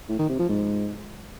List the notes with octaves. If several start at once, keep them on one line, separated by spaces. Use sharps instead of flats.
A2
D#3
C3
F3
G#2